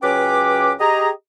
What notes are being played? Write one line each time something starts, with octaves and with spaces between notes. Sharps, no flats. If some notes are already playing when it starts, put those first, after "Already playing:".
C#2 F#3 C#4 B4 G5 D6
G4 G#4 D#5 A#5